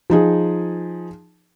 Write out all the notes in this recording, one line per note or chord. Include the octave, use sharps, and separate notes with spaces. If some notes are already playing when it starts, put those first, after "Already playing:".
F3 D#4 G#4